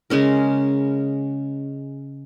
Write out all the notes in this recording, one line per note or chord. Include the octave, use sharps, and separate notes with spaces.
C#3 G#3 C#4 A#4